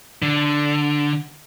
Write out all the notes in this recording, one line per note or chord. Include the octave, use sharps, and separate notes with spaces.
D3